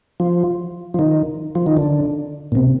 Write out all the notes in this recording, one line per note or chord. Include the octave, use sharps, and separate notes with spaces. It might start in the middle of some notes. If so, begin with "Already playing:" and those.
F3
F3
D#3
F3
D#3
D3
A#2
C3